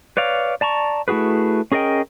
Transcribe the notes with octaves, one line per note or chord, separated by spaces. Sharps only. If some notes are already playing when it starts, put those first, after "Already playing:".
B4 C#5 D5 F5
D5 A5 A#5 C#6
A3 E4 F#4 G#4 B4
C#4 G#4 A#4 D#5 G5